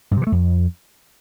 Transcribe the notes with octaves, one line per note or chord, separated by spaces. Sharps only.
G2
C3
E3
A3
F2